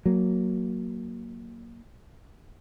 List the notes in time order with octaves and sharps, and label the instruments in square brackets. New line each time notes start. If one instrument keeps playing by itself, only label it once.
[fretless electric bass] F#3 A#3